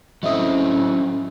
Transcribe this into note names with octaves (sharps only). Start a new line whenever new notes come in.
A2 F#3 C4 C#4 D#5 E5 D#6